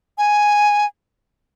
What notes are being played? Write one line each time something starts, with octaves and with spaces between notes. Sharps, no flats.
G#5